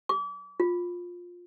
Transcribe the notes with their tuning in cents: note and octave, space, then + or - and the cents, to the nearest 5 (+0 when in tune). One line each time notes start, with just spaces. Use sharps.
D6 -35
F4 +15